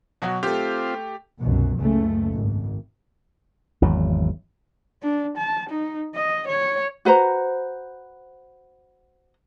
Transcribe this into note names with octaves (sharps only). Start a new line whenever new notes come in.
B2 F#3 F#4
A3 C4 F4 G4
C2 F#2 B2
F#1 C#2 C#3 A3
G#1
G#1 E2 F#3
D4
A5
D#4
D#5
C#5
F#4 B4 C5 A#5